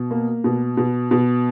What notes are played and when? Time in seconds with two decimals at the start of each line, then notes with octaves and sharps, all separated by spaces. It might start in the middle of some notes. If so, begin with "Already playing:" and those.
Already playing: B2
0.11 A#3
0.44 B2
0.77 B2
1.11 B2